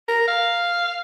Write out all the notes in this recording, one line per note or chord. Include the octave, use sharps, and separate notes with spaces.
A#4
F5